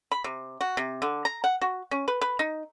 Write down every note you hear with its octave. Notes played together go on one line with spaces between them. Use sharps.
B5
C3
F#4
C3
D3
A#5
F#5
F#4
C#4
B4
B4
D#4